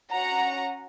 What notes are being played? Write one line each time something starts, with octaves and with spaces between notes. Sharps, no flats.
C#4 F#4 F#5 A#5